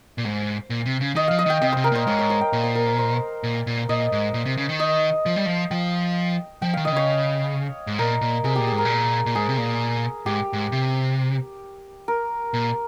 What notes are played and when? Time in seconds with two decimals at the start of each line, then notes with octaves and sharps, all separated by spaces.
0.18 A#2
0.25 G#2 C5
0.70 A#2
0.86 C3
1.01 C#3
1.16 D#3 D#5
1.28 F3 F5
1.39 D#5
1.46 D#3 G5
1.62 C3 D#5
1.73 C3 C5
1.84 A#4
1.92 A#2 C5
2.07 G#2 C#5
2.19 C#5
2.30 C5
2.41 G5
2.53 A#2 C#5
2.64 C5
2.75 A#4
2.87 C5
2.98 C5
3.43 A#2
3.67 A#2
3.89 A#2 D#5
4.12 G#2
4.34 A#2
4.46 C3
4.57 C#3
4.69 D#3
4.80 D#5
5.26 F3
5.36 G3
5.46 F3
5.71 F3 G5
6.62 F3 G5
6.73 D#3 F5
6.85 D#3 D#5
6.92 C#3 C#5
7.87 G#2
7.98 A#2 A#4
8.21 A#2
8.44 C3 G#4
8.55 A#2 G4
8.67 G#4
8.72 G#2
8.78 A#4
8.85 A#2
9.26 A#2
9.35 G#2 G#4
9.49 C3
9.57 A#2
10.26 G#2 G4
10.53 G#2
10.72 C3
12.08 A#4
12.54 A#2